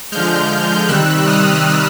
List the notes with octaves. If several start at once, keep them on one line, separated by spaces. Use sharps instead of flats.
D3 F3 G#3 F6 G6
C3 D#3 G3 E6 F#6
D#6 F6